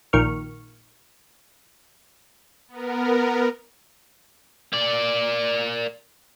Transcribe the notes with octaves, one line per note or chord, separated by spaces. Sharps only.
A#1 D#3 A#3 C#6 F6
B3 A#4
A#3 D5